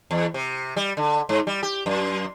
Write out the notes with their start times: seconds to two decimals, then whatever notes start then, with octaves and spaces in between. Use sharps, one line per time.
0.11 E2
0.34 C3
0.77 G3
0.97 D3
1.29 G#2
1.47 G3
1.63 G4
1.86 F#2